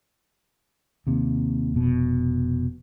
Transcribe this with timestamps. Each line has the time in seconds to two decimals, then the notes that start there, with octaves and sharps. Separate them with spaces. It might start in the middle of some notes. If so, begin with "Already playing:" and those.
1.07 D#2 C3
1.74 F1 B2